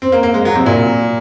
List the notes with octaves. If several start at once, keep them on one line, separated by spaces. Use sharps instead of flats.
C4
A#3
A#3
G#3
F#3
C3
A#2